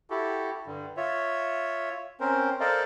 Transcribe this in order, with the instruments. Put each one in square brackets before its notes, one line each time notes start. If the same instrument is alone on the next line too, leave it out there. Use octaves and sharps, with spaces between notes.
[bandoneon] E4 F#4 G4 A4
G2 D3 G3
F4 C#5 E5
C4 C#4 A#4 C5
A4 A#4 C5 D5 D#5 F5